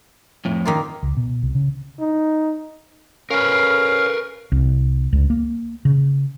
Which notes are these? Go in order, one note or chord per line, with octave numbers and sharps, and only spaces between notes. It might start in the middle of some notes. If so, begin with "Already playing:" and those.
F2 A2
D#3 A#3 F4
C#2
B2
C2
C#3
D#4
C#4 A#4 B4 F5
C2
C#2
A#3
C#3